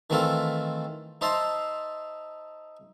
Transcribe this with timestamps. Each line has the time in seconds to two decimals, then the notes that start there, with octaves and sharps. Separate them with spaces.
0.10 D#3 E3 A3 C4 F4 A4
1.21 D#4 C5 E5 A5 A#5 C6